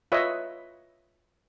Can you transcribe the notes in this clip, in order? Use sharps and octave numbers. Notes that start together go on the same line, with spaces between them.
F4 B4 C#5 D#5 E5